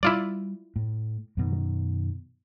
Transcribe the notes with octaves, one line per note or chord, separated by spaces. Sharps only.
G3 E4 F4 D5
A2
F#2 B2 D#3